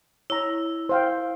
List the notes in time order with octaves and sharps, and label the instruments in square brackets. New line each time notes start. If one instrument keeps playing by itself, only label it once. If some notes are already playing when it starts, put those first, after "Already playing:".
[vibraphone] E4 [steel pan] C#5 A#5
[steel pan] C5 F5 G5